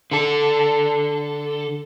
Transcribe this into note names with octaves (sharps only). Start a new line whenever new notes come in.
D3 A4